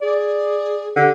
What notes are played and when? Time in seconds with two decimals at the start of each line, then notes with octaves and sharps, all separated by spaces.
0.02 G#4 D5
0.96 D3 G4